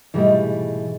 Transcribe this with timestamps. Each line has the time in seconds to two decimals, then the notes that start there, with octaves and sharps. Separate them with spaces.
0.14 G#2 B2 E3 G3 A3